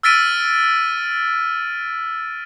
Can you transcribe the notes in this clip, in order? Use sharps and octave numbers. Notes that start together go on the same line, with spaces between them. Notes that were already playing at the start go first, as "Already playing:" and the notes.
E6 F6 A6 B6 D7 D#7